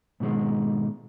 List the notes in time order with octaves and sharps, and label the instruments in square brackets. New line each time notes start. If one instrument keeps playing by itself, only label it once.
[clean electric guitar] G#2 B2 D#3 G3 G#3